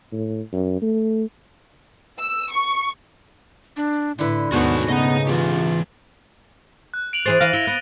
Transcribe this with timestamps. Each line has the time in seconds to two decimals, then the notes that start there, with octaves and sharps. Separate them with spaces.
0.12 A2
0.52 F#2
0.82 A3
2.19 E6
2.52 C#6
3.77 D4
4.19 A2 D3 E4 B4
4.52 D#2 G#2 B2 A3 B3 F#4 B4 C#5
4.89 C#3 B3 D#5 A#5
5.27 E3 A#3 F4 G4
6.94 F#6
7.13 D7 F7 F#7
7.26 E3 G#4 C5 A6
7.40 E3 C5 F5 A#6 D#7
7.53 E4 A#6 G7
7.67 B3